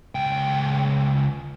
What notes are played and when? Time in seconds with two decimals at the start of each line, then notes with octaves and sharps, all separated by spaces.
0.15 C#2 G5